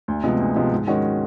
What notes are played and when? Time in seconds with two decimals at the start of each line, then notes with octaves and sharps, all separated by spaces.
0.08 D2
0.23 C3 F3 G#3 B3
0.40 D2
0.56 C3 F3 G#3 B3
0.71 G#2
0.87 D#3 G#3 C#4 F#4